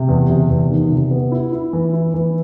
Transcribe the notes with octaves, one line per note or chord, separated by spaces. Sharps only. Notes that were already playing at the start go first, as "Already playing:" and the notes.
Already playing: C3
E2
C3
E2
D#3
C3
B3
E4
E4
E3
E4
E3